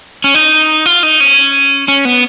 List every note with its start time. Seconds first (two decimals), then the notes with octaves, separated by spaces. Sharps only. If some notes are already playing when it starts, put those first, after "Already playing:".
0.24 C#4
0.35 D#4
0.86 F4
1.03 D#4
1.20 C#4
1.88 C#4
2.05 B3